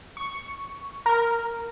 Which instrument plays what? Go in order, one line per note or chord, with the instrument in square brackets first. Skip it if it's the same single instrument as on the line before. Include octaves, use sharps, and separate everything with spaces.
[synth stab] C#6
A#4